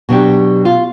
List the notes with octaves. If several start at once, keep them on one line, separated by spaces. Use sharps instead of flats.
B2 F#3 D4 G4
F4